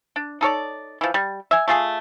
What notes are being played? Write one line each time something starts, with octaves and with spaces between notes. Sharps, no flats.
D4
D#4 A4 C#5 D5
E3 F3
G3
E5 G#5
A3 F4 G#4